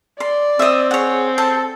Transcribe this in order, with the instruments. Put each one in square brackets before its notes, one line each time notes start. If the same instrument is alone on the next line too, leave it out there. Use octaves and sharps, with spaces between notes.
[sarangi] D5 [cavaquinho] C6
[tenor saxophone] C4 [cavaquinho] D#5 E5
[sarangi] G#4 [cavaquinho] C#5 F#5
[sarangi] A4 [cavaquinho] A5